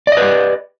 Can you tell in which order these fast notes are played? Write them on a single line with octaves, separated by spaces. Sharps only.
D5 D#5 B4 G4